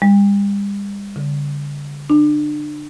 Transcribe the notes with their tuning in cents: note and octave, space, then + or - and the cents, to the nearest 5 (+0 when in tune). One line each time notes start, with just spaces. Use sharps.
G3 +40
D3 -35
D4 +30